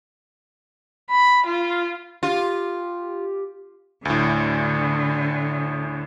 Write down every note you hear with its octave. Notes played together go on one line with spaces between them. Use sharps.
B5
F4
F4 G4
D2 A2 D3